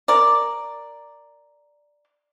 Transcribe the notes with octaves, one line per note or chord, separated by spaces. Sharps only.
A#4 D5